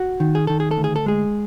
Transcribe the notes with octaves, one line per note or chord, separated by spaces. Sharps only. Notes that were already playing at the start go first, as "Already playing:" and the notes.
Already playing: F#4
D#3
G#4
D#3 A4
G#4
A4
D2
G#4
A4
G#3 G#4